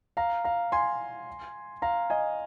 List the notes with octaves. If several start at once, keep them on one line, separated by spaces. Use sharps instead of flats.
F5 A#5
F5 A#5
G#5 C6
F5 A#5
D#5 G#5